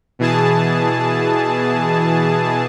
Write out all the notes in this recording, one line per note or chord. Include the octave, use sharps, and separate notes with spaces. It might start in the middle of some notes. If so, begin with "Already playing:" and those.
B2 E3 G#4 A5